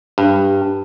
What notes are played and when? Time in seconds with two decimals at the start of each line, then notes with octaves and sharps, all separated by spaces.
0.18 G2